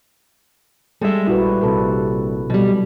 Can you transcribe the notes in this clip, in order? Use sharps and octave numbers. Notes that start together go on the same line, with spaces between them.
G3 G#3 A4 E5
A#1 E4 F#4 B4
A#1 C3 A4 B4
B2 F#3 G3